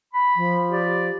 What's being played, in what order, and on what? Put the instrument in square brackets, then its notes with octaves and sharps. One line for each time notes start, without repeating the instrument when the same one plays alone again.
[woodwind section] B5
[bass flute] F3
[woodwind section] G4 D5